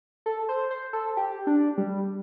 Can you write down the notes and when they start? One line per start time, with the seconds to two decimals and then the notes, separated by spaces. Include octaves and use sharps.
0.26 A4
0.49 C5
0.71 C5
0.93 A4
1.17 G4
1.47 D4
1.78 G3